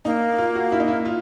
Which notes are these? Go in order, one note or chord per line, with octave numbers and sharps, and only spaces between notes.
A#3 D#4
F4
F#4
E4
D#4
E4
F4